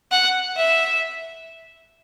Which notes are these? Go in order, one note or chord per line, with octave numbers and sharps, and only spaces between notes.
F#5
E5